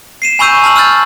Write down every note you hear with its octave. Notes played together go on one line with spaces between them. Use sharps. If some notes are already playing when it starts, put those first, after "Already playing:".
C7 D#7 E7
G#5 B5 C#6 E6 G6 D#7
A5 B5 F6 F#7
E6 F6 G6 A6